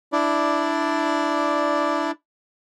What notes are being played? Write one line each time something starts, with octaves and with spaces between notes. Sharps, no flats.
D4 E4 D5